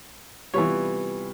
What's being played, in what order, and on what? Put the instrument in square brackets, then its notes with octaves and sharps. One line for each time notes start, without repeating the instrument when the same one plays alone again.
[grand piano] C3 G3 F4 [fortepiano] E3 B3 C#5